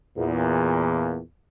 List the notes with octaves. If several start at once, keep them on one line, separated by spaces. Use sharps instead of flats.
E2 A#2